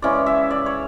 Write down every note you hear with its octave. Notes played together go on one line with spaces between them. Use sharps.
C#3 E3 G#3 C#4 D5
E5
D5
C#5